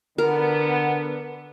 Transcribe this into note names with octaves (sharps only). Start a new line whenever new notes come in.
D3 B3 A#4